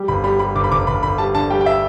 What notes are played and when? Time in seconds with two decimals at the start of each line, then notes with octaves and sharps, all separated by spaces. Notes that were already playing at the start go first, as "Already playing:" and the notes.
Already playing: G3
0.08 G1 B5
0.24 G3 B5
0.39 G3 B5
0.55 G1 D6
0.64 B5
0.71 G1 D6
0.87 G1 B5
1.03 G1 B5
1.18 G3 A5
1.34 D3 A5
1.50 G3 G5
1.61 G5
1.66 E5